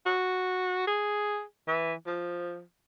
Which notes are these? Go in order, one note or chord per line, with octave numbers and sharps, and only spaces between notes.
F#4
G#4
E3
F3